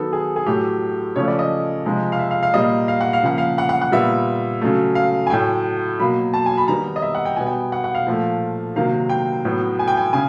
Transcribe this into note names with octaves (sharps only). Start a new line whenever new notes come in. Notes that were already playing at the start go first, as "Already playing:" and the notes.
Already playing: D#3 F#3 B3 A4
G#4
G#4
A2 F#3 A3 G4
C#3 F3 A3 C#5
D5
D#5
C3 F3 G#3
F5
E5
F5
F5
A#2 G3 A#3 D#5
F5
F#5
F5
C#3 F3 A#3 F#5
F5
F#5
F#5
F#5
A#2 G3 B3 E5
C#3 F#3 A3
F5
G#5
A2 F#3 A3 G5
B2 F#3 A#3 B5
A5
G#5
B5
D#3 G3 B3 A#5
D#5
E5
F#5
G5
B2 G3 B3 G#5
G5
F#5
F#5
F5
A#2 F3 A3
C3 D#3 F#3 A#3 F5
G5
A2 F#3 B3
G#5
G5
G#5
C#3 G#5